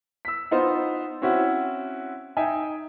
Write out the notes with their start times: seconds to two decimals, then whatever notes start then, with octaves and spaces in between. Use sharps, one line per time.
0.25 E6 B6
0.51 B3 D#4 F4 C5
1.22 C4 C#4 E4 F#4
2.37 D#4 E5 G5 G#5